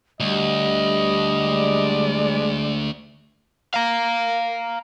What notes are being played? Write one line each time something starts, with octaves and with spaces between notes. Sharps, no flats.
D2 G3 D#5
G#3 D5
F5 A#5